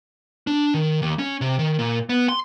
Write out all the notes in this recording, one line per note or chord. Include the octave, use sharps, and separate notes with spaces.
D4
D#3
D#2
C#4
C3
D#3
A#2
B3
C6